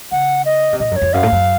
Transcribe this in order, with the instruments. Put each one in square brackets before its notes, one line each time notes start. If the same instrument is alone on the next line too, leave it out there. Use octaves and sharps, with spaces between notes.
[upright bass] C#3 [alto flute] F#5
[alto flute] D#5
[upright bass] C3
[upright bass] A#2 [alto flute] D#5
[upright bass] F#2
[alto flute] C#5
[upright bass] F2
[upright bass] F#2 [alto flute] F5
[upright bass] A2
F#2